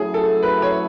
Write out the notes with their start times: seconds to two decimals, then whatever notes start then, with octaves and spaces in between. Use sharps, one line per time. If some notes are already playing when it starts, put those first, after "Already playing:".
Already playing: F#3 A3 C#4 E4 G#4
0.14 A4
0.43 B4
0.62 C#5